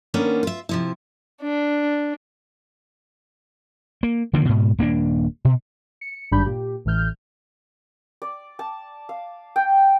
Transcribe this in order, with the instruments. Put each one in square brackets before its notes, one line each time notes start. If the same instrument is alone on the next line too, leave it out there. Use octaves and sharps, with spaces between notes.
[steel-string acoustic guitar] D#3 A#3 B3 C#4 D4
F4 E5
C3 F3 E4
[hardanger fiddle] D4
[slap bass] A#3
D3 D#3 F3 A#3
G#2 B2
D#1 A#3 C4 D4
B2
[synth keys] C#7
G#1 G2 D4 B5 G6
A#2 G4
A1 A2 E3 F6 G6
[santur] D5
A5
F5
G5